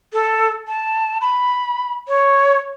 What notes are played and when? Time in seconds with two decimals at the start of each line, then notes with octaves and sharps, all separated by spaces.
0.13 A4
0.67 A5
1.21 B5
2.08 C#5